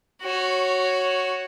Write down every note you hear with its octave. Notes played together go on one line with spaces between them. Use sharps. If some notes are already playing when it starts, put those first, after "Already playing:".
F#4 C#5